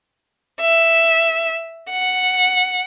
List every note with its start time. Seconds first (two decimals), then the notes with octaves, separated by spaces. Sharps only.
0.60 E5
1.89 F#5